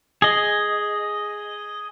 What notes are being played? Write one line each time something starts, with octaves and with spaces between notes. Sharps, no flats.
G#4 D#5